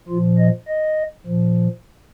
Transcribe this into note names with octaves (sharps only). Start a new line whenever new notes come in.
A#2 F3 F4
D#5
D#5
A#2 F3